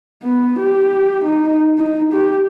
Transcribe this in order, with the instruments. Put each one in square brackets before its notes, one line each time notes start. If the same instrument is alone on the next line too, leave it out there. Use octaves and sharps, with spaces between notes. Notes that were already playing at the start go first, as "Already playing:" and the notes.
[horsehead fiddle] B3
G4
D#4
D#4
G4